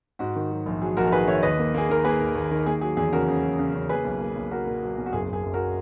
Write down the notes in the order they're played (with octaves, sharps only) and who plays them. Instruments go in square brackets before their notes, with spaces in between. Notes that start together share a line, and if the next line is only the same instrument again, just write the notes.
[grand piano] G#2 F#4
D#3
F#3
A#1
F#3 G#4
A#1 F#4 A#4
A#4
D#3 G#4 B4
D#3 C#5 E5
D#2 B4 D#5
A#3
A#3 G#4
D#3 A#4
A#3 G#4 B4
D#2
D#2
D#3
A#3 G#4
F#3 G#4
E2 G#4
C#3 F#4 A#4
C#3
F#3
C#3
C#3
A#3 G#4 B4
B1
A#3
B1
F#3 F#4 A#4
A#2
F#3
B1
F#4
F#1 G#4
F#1 G#4
F#2
F#4 A#4